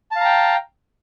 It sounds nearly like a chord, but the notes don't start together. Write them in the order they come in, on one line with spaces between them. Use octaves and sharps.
A5 F5 A#5 G5